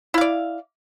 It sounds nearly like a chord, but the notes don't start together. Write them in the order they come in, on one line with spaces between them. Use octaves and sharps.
E4 F5 D5